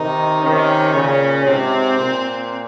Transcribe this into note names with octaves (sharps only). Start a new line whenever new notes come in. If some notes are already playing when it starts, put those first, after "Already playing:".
Already playing: C3 D#3 D#4
C3 D#3 C#4
A#2 C#3
G#2 C3 C4
A#2